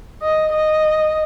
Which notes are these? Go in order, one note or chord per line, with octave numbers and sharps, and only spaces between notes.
D#5
D#5